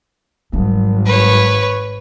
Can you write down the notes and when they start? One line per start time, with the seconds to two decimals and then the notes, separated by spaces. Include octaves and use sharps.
0.53 G#1 F#3 G3
1.06 B4 C#5